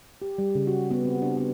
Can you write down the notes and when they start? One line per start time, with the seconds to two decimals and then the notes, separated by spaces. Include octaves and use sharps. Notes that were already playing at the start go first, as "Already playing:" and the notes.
0.22 G4
0.38 G3
0.55 C#3
0.67 F#4
0.91 B3
1.05 C4
1.22 D4
1.37 B3